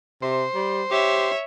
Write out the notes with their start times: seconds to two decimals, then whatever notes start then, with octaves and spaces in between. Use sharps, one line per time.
0.22 C3 C5
0.55 G3
0.91 G4 C#5 E5